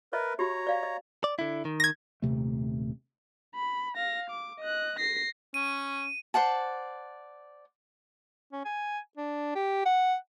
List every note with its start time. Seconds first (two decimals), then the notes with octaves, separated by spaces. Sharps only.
0.13 A#4 B4 C#5 D#5 E5
0.39 F#4 G4 C#5 A#5
0.67 D5 F5
0.83 D#5
1.24 D5
1.39 D3 E4
1.65 D#3
1.80 G#6 A#6
2.22 D#1 E2 C3 A3
3.55 B5
3.96 F5 A#6
4.29 D6
4.60 D#5 F#6
4.99 A#6 C7
5.54 C#4 D#7
6.34 C5 D5 F#5 A5
8.52 C#4
8.65 G#5
9.17 D4
9.55 G4
9.85 F#5